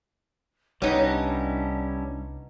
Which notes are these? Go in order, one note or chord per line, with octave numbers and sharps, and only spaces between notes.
C2 G3 B3 C#4 D#4 E4 C#5
D4